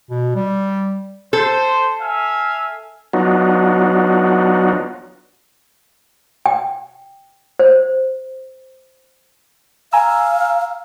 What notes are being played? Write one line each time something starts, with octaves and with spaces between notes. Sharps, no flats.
B2
G3
A4 C5
E5 F5 G#5
F#3 B3 D4 D#4 F4 F#4
G5
C5
F5 G#5 A#5 E6